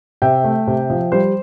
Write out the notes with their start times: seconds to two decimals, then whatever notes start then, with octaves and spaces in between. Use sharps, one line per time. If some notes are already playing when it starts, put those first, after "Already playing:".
0.22 C3 E5 G5
0.44 A3
0.67 C3
0.90 F3
1.12 G3 C5